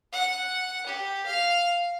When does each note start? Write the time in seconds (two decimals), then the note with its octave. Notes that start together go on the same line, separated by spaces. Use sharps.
0.13 F#5
0.87 G4
1.26 F5